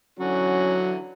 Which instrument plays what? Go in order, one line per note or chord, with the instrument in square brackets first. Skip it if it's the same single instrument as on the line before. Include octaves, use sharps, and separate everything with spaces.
[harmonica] D3 E3 F#4 [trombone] F#3 [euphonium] C#4